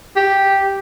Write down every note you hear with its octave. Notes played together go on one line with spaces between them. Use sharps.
G4